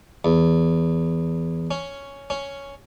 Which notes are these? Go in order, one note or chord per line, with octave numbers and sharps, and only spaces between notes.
E2
C#4
C#4